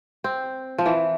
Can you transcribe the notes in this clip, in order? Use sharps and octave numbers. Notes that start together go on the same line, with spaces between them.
C4
F3
E3